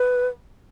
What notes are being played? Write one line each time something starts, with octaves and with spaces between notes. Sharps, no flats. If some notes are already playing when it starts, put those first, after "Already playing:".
Already playing: B4